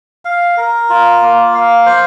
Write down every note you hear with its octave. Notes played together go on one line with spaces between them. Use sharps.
F5
A#4
F4
A#3
F5
C5